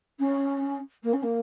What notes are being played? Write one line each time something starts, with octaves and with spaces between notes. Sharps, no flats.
C#4
A#3
C#4
A#3